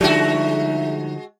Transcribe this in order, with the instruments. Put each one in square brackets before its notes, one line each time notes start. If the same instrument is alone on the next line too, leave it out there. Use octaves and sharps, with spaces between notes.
[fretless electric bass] D3 F3 G3 [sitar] G#3 F#4 [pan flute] D#4 [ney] E5